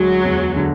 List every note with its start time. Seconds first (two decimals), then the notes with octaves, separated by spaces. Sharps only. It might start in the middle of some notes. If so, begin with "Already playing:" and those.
Already playing: D2 F#3 G#3
0.25 E2
0.56 D3